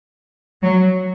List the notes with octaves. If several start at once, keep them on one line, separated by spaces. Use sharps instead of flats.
F#3